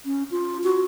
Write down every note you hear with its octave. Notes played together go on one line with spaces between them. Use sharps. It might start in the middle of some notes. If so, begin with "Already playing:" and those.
C#4
F4
F#4